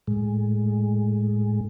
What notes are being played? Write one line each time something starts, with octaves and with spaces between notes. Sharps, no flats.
A2 G#3